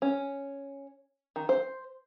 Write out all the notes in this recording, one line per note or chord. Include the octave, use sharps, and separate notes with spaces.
C#4
D#3
C5